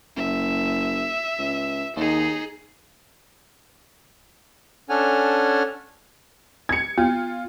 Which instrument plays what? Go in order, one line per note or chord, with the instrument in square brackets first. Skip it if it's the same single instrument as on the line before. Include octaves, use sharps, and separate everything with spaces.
[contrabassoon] F#1 [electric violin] E5
[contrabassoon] C#2
[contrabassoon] D#2 [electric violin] D#4 G#4
[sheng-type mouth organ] C#4 D4 A4 F#5 G#5 F6
[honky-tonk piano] G#6 C#7
[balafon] B3 [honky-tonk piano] F4